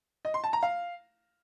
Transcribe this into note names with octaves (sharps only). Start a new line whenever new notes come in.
D#5
C6
A5
A#5
F5